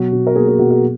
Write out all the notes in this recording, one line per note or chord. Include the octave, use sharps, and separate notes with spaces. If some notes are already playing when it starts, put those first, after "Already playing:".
Already playing: B2 F#3 F#4
B2
A#4
A#3 G#4
G#4
B2 F#4
F#4